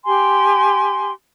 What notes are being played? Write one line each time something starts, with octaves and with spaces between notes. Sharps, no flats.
G4 G#5 C6